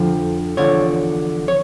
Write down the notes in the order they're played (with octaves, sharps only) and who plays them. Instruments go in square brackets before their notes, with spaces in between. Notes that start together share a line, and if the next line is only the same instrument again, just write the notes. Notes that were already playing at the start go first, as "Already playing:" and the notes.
Already playing: [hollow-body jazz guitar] F2 D3 F3
E2 D3 F3 C#5
C#5